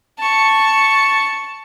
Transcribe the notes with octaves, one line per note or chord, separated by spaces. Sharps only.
A5 C#6